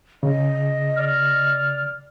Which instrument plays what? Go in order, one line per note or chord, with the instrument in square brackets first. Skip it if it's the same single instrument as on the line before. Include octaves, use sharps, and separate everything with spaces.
[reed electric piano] C#3 [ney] D#5
[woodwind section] D5 F6